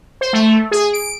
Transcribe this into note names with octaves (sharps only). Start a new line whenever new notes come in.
C5
A3
G#4
D7